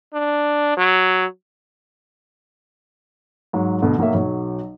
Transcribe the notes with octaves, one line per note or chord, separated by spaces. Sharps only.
D4
F#3
G#2 F#3
D2 B2 D3
B1 F#3 A#3 E5
B1 F#3